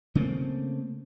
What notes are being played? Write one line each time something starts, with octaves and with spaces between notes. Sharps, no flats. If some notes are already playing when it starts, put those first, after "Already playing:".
C#3 A3 A#3 C4